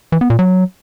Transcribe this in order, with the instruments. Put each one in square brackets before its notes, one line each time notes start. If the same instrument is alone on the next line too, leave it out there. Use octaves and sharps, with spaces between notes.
[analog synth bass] E3
B3
A#2
F#3